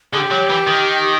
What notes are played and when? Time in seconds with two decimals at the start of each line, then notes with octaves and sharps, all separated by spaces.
0.12 D3 G#4
0.17 G4
0.31 F#3
0.50 E3
0.67 D#3